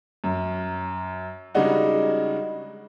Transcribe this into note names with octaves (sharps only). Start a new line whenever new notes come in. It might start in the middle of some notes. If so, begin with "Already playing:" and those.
F#2
C#3 G3 G#3 D4 D#4 F#4